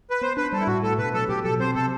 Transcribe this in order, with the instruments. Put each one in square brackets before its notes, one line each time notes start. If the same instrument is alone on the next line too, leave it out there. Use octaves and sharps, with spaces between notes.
[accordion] B4
[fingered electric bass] B3 [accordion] C5
[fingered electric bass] D4 [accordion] B4
[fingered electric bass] G3 [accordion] A4
[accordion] E4
[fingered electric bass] A2 [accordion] F#4
[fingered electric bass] A3 [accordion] A4
[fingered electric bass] B2 [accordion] B4
[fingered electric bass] F#3 [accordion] A4
[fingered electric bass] B2 [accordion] G4
[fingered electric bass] F#3 [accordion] A4
[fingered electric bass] C4 [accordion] C5
[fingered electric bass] C3 [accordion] A4